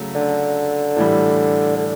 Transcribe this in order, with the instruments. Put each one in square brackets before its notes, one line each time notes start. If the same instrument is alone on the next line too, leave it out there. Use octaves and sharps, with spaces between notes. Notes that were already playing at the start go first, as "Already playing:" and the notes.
Already playing: [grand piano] C#3 F#3 A3
[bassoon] D3
[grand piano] A2 E3 G3
[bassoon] D3